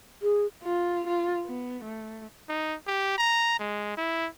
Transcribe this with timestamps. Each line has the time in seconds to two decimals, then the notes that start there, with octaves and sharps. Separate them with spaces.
0.22 G#4
0.63 F4
1.07 F4
1.46 B3
1.85 A3
2.49 D#4
2.87 G4
3.18 A#5
3.60 G#3
3.97 E4